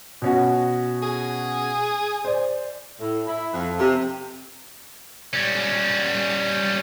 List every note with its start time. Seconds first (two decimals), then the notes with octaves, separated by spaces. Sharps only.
0.22 B2 C#4 F#4
1.03 G#4
2.25 C5 D5
3.00 A2
3.27 E4
3.53 F2
3.79 C3
5.33 G3 C#4